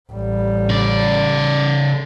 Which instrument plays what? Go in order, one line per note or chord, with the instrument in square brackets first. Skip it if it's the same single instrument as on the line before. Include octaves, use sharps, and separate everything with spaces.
[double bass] A1 G3
[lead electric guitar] C#3 D5